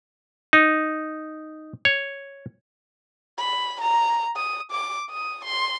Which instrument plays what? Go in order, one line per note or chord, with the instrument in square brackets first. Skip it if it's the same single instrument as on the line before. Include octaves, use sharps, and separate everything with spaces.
[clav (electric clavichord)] D#4
C#5
[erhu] B5
A#5
D#6
D6
D#6
C6